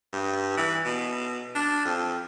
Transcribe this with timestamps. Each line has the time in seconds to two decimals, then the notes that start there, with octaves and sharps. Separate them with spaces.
0.13 G2
0.57 E3
0.85 B2
1.55 D4
1.85 F2